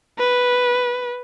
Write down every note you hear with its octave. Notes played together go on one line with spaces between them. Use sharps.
B4